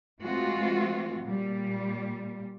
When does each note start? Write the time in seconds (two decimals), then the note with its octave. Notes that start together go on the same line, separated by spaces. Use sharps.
0.21 E3 G#3 A3 C4 F4 F#4
1.24 A#2 G3